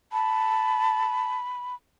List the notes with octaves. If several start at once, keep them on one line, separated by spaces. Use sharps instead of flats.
A5 B5